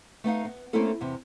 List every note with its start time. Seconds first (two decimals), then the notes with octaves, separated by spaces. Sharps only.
0.24 A3 B3 D#4 F5
0.45 B3
0.73 A3 A#3 C4 C#4 E4 A4
1.01 E2 C3